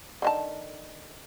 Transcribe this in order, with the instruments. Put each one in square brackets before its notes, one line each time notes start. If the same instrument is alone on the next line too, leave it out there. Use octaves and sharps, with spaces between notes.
[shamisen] D3 D#3 A5